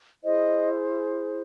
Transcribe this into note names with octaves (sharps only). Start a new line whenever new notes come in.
E4 G#4 C5 D#5